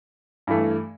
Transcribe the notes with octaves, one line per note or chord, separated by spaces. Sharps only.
G2 E3 A3